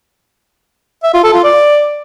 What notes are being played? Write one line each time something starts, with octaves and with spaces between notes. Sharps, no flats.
E5
F4
A4
F4
D5